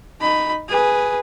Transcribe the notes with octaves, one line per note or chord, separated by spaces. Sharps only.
D#4 B5
G#4 B4